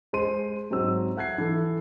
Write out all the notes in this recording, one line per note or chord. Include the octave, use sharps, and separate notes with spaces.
G#3 C5 C6 D#7
G#2 F#3 C4 E6
E5 F#5 F#6 G#6 C7
E3 A4